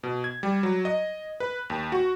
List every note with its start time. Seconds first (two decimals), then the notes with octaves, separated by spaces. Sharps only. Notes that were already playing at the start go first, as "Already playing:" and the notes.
0.03 B2
0.24 G#6
0.43 G3
0.63 F#3
0.85 D#5
1.40 B4
1.70 D#2
1.92 F#4